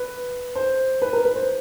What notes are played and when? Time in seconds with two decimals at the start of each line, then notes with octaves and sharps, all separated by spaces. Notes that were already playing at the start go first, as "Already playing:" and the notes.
Already playing: B4
0.55 C5
1.02 B4
1.13 A#4
1.25 B4
1.35 C5